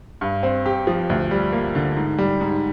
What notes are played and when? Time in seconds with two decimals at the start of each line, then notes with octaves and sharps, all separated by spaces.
0.21 G2
0.43 C4
0.66 G4
0.87 F3
1.10 D2
1.31 G3
1.53 A#3
1.75 D3
1.96 G#2
2.18 G3
2.41 G#2